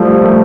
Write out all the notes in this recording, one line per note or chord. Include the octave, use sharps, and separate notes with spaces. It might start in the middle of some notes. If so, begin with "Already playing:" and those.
Already playing: F3 G3 A3
A3